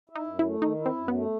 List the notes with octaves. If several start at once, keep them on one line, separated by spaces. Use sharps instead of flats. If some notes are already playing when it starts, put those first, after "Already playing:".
E4
D#4
F#2
E4
A3
D#3 D#4
E4
C4
F#2
B3
A3